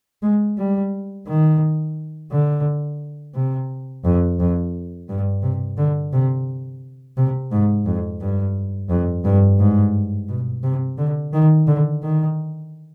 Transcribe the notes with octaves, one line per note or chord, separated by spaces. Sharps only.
G#3
G3
D#3
D3
C3
F2
F2
G2
C3
D3
C3
C3
G#2
F2
G2
F2
G2
G#2
B2
C3
D3
D#3
D3
D#3